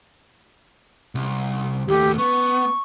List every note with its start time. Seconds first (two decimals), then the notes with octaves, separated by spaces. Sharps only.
1.15 C2
1.88 D#2 A3 G4
2.18 B3 C#6